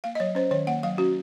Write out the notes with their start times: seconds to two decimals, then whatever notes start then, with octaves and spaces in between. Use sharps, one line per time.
0.04 A#3 F5
0.15 D#5
0.20 F#3 C#5
0.35 C#4 C5
0.51 D#3 C#5
0.67 A#3 F#5
0.83 F#3 F5
0.98 C#4 F#4